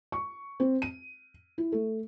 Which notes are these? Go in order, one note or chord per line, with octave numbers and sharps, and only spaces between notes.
C#6
C4
D#7
E4
A3